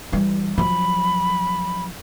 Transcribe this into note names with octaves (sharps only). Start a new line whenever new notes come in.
E3 G3
F3 F#3 B5